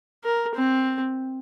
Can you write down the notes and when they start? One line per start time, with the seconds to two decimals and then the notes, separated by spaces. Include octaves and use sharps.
0.24 A#4
0.55 C4